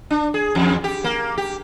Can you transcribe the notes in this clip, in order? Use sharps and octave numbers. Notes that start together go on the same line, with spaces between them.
D4
G#4
E2
G4
A#3
G4